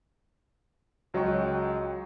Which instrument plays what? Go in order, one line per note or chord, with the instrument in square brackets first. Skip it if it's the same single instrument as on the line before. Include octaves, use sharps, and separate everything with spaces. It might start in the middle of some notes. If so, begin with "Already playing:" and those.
[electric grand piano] C#2 F#3 F#4 D#5 G5 C#6